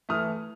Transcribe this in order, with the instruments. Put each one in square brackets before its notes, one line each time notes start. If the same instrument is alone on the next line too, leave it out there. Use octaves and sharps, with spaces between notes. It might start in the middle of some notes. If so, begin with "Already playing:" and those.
[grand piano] E3 A3 D#6 F6